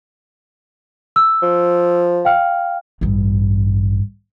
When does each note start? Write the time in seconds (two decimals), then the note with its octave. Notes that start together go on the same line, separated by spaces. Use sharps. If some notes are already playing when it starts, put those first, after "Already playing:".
1.16 E6
1.43 F3
2.25 F5 G5 F6
3.01 A1 G2